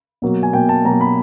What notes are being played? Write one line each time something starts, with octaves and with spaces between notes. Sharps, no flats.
B2 F#3 A#3
G#5
B2 F#3 A#3 G5
A5
B2 F#3 A#3 A#5
B5